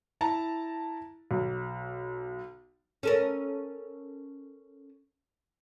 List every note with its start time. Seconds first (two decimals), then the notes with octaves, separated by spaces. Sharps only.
0.21 E4 A5 A#5
1.31 B1
3.03 C#4 A4 A#4